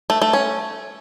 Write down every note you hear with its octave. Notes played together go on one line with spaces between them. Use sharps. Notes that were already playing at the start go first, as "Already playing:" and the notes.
A3
A3
C#4